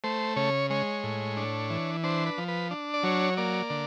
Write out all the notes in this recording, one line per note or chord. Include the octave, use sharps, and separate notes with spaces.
A3 C5
C#3 C#5
G#3 C#5
A2
D4
E3
D4 C5
B4
F3
B4
D4
D5
F#3 C#5
A#3 D5
D3